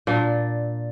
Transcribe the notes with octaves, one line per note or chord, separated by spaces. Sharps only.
A#2 D4